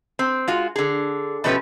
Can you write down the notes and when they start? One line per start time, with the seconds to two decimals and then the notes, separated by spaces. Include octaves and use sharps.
0.19 C4
0.48 G#3 F4 F#4
0.76 D3 G#4
1.44 B2 F3 A3 C#4 G4 B4